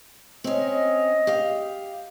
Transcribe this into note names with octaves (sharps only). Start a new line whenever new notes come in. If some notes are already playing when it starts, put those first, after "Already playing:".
C4 C#4 D#5
G4 F5